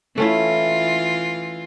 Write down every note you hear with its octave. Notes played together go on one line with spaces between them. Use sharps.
E3 A3 C#4 E4 F4